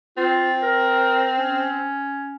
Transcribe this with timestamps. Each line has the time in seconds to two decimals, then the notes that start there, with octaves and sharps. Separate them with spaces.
0.17 C4 F4
0.62 A#4
1.39 C#4